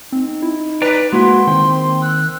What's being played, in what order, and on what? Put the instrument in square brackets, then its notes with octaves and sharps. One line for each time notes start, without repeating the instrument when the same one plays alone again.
[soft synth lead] C4 [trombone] D#4
[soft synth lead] E4
[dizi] B4 [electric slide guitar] D5 G5 A#5 [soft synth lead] F#6
[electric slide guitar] G#3 E4 [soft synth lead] A#3 [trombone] F#4 [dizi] C6
[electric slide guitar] D#3 G5 [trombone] C4
[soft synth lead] E6 [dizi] F#6